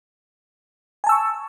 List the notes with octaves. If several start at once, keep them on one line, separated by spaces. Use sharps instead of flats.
G#5 A5 C#6 E6